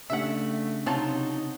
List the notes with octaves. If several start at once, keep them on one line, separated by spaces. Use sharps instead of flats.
C#3 A3 D4 G4 E5 F#5
C3 F#3 D#4 F4 A5